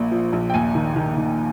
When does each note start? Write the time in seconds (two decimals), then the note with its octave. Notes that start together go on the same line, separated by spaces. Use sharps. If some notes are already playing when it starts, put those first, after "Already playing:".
Already playing: A#1 A#2
0.11 F3
0.33 A#1
0.50 G5
0.54 D#2 G#5
0.75 D#3
0.96 D#3
1.17 D#3